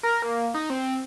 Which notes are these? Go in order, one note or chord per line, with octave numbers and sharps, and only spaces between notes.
A#4
A#3
D#4
C4